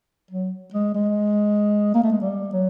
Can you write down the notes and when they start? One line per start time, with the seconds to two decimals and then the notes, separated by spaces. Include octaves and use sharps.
0.31 F#3
0.74 G#3
0.95 G#3
1.95 A#3
2.03 A3
2.12 G#3
2.21 G3
2.53 F#3